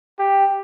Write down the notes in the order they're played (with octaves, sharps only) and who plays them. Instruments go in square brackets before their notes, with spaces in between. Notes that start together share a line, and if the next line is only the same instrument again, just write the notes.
[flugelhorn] G4